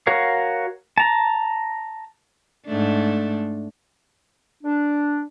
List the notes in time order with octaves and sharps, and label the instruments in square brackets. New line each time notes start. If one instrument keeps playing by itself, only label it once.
[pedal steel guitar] F#4 A#4 C#5 F5
A5 A#5
[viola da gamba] G#2 A3 D4
[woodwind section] D4